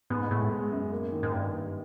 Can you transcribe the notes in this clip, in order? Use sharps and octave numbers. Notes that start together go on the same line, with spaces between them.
G#2 B3
A2 G#3
G#3
F#2
A#3
D#3
G#2
G2 A#3
A#3